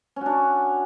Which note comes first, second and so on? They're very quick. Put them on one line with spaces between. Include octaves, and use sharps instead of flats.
C#4 F#4 D4